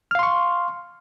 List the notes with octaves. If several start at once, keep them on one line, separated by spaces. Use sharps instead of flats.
F5 C6 C#6 F6